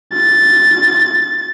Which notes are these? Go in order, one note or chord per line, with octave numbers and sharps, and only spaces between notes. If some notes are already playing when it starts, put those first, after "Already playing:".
A6